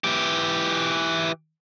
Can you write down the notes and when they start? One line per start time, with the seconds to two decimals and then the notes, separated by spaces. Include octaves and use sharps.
0.04 E3 G4